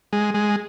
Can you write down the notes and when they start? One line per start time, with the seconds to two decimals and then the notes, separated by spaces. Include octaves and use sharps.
0.13 G#3
0.34 G#3